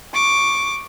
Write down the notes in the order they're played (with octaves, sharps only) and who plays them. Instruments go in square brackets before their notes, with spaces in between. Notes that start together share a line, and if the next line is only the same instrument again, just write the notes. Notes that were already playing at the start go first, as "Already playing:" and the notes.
[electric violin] C#6 [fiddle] D6